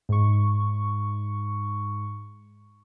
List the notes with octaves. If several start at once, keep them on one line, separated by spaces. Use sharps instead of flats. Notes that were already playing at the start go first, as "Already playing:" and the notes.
G#2 C#6